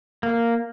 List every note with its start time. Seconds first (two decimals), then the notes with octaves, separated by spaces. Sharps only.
0.23 A#3